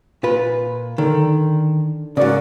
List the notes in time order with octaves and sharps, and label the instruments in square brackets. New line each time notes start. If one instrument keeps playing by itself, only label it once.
[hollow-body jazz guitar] A#2 F4 B4
[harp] D3 [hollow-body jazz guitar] D#3
[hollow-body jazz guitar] G#2 C#3 [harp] F#4 A#4 D6 [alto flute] D5